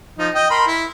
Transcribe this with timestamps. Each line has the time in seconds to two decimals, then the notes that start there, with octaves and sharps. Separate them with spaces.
0.18 F3 D#4
0.35 D#5 G5
0.50 A#4 B5 C6
0.67 E4